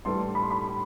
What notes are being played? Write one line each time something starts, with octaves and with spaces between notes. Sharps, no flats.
A2 E3 G3 D4 A4 C6
B5
C6
B5